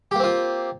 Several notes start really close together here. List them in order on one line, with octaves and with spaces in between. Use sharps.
G4 A#3 C4 F4